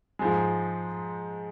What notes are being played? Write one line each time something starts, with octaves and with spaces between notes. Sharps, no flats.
G#2 F3 G#3